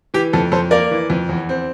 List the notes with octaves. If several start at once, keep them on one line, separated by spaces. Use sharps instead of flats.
E3 G4
F2 A4
F2 A4 C5
A#3 A#4 D5
E3
F2
E2
C4